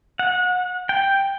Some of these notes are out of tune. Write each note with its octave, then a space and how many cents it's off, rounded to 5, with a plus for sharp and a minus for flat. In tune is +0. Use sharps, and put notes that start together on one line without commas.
F#5 -30
G5 +5